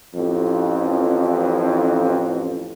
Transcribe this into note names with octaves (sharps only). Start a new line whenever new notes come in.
A1 F2